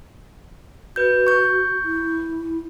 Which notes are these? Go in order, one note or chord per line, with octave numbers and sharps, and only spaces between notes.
F#4 B4 G6
C#6 G6
E4